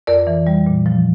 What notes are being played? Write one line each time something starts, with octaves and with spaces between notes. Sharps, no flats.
F2 A#4 D5
E3
G3
A#2
F3